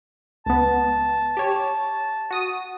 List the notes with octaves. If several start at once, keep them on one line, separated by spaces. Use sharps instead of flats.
C#2 B3 A5
G4 C#5
F#4 D#6 D#7